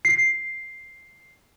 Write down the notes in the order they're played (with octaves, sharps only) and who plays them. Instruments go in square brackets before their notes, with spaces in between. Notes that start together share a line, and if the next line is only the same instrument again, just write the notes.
[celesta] C7